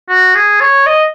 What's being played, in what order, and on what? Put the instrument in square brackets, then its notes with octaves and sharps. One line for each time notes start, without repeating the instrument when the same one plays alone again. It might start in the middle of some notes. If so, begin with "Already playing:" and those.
[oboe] F#4
G#4
C#5
D#5